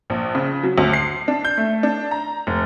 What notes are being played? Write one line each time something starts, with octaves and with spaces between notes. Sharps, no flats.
A#1
C#3
F#3
D2
C7
D4
G6
A3
D4
A#5
F1